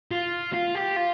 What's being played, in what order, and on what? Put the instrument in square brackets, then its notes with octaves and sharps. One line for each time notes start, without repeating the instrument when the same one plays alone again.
[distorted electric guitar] F4
F4
G4
F4